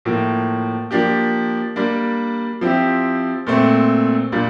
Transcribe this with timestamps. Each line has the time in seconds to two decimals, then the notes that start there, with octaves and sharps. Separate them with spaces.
0.05 A2 F3 A#3
0.91 F3 A#3 D4 G4
1.76 G3 A#3 D4
2.61 F3 C4 E4 G4
3.47 A#2 A3 C4
4.32 A#2 G3 D4 F4